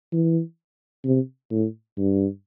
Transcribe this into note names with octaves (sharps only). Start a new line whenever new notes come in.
E3
C3
A2
G2